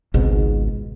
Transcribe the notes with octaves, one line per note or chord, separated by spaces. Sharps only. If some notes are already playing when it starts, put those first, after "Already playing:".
G#1 C#2 G#2 B2